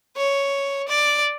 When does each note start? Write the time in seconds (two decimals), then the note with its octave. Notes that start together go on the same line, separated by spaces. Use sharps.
0.17 C#5
0.89 D5